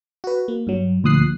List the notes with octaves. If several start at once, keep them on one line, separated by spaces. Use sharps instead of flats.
F#4 B4
A#3
G2 F#3
D2 A#2 F3 D#6 F#6 C7